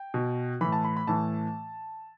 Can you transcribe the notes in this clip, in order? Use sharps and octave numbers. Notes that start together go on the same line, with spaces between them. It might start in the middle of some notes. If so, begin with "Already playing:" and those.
Already playing: G5
B2
A2 E3 B5
A5
B5
B5
A2 E3 A5